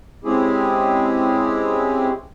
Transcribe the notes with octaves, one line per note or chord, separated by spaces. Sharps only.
G#3 C4 C#4 E4 G4 G#4